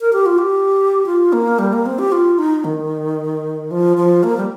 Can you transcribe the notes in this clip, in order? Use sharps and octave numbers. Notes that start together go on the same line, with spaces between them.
A#4
G4
F4
G4
F4
A#3
G3
A#3
C4
G4
F4
D#4
D#3
F3
F3
A#3
G3